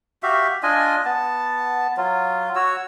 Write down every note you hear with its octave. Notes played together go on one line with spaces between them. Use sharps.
F#4 G4 E5 F5
D4 F4 D#5 G#5
B3 A5
F#3 F4
F#4 C#5 E6